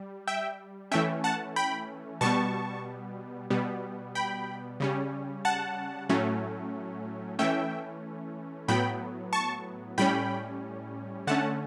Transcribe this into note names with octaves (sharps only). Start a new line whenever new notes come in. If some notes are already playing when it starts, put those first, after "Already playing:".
Already playing: G3
E5 G5
E3 A3 C#4 E5 G5
F#5 A5
G5 B5
B2 G3 B3 A5 C#6
B2 G3 B3
G5 B5
C#3 G3 C#4
F#5 A5
A2 F#3 A3 C#4
E3 A3 C#4 E5 G5
A2 F#3 B3 G5 B5
A5 C#6
A2 G3 C#4 G5 B5
D3 A3 C#4 F#5 A5